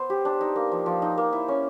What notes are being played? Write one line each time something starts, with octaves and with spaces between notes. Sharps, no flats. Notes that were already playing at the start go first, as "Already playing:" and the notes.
Already playing: B3 C5
G4
D4
D#4
A#3
F3
F3
D#4
A#3
E4
C#4